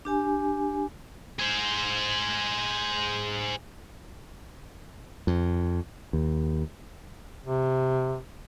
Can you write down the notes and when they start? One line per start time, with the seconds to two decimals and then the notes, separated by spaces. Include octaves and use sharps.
0.05 D4 G4 G#5
1.39 G#4 C5
5.27 F2
6.13 D#2
7.46 C3